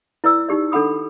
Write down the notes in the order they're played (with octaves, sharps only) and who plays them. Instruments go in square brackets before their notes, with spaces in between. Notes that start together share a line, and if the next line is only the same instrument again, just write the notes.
[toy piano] E4 B4 D5 E6
D#4 G4 D5
D4 A4 F#5 B5 D#6